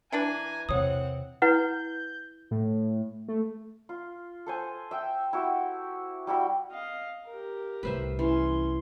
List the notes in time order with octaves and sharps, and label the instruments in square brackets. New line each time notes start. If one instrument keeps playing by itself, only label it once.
[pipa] E3 D4 B4 [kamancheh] G#5 A#5
[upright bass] E2 C3 [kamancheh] C4 F#5 [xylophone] C#5 D#6
[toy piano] E4 B4 F#5 [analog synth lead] G6
[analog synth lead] A2
A3
[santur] F4
A4 C5 G#5
E5 G5
E4 F#4 G4
G3 E4 F#4 B5
[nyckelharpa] D#5 F5
G4 A#4
[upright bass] C2 A2 [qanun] B4 C5 E5
[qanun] E3 [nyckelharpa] C#4 C6